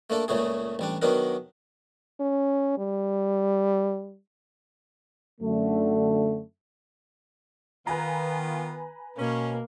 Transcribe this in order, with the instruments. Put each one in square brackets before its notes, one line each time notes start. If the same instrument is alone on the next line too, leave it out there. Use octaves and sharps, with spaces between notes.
[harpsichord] A3 A#3 D4 A4
C#2 A#2 C#3 A3 G#4
A1 G3 D4
D#3 F#3 B3 D4 A#4
[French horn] C#4
G3
[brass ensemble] F#2 D3 A3
[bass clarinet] D#3 [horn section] B3 F4 [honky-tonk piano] B4 G#5 A#5
[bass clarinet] B2 [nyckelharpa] A#3 [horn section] C#4